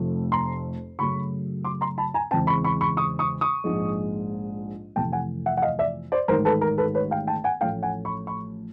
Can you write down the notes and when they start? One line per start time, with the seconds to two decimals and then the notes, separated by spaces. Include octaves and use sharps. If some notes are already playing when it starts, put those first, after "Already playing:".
Already playing: F1 F2 C3 F3 A3
0.32 A#5 C6
0.99 F#2 C#3 F#3 A3 B5 C#6
1.64 C6 D6
1.81 A#5 C6
1.98 A5 B5
2.14 G#5 A#5
2.31 E2 C#3 E3 G#3 C4 G5 A5
2.47 B5 C#6
2.64 B5 C#6
2.81 B5 C#6
2.97 C#6 D#6
3.19 C#6 D#6
3.41 C#6 D#6
3.64 A#1 G#2 F3 G#3
4.96 F2 C3 E3 A3 G5 A5
5.12 F#5 G#5
5.46 E5 F#5
5.57 F#5
5.62 D#5 F5
5.79 D5 E5
6.12 C5 D5
6.28 A1 G#2 D#3 A#4 C5
6.45 A4 B4
6.61 A#4
6.78 A4 B4
6.95 B4 C#5
7.11 F5 G5
7.27 G5 A5
7.44 F#5 G#5
7.61 A1 A2 F3 A3 C#4 F5 G5
7.83 F#5 G#5
8.05 B5 C#6
8.27 B5 C#6